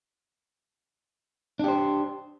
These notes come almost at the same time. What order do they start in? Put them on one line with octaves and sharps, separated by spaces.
D4 G4 C5